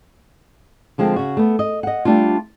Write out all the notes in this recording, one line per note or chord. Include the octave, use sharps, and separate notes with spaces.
D3 F3 G#3 C4
C#3 F#4
A3 B3
D#5
D#5 F#5
G3 A3 D4 F4